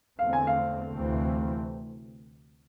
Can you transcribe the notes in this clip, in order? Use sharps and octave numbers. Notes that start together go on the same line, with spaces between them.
E2 D3 A3 C4 F5
G#5
F5
D2 C3 E3 A3 C4